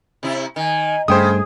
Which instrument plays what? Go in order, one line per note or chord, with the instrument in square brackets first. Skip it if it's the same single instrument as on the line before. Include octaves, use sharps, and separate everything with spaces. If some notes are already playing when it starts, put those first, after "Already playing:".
[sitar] C3 E4
[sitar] D#3 [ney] G#5
[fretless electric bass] G2 A3 [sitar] C#3 [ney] G#4 [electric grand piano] C5 G5 D#6